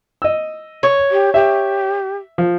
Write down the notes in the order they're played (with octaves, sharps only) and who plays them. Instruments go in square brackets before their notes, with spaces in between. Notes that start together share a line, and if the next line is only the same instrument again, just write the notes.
[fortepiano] D#5 E6
[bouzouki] C#5
[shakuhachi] G4
[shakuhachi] G4 [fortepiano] E5
[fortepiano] F3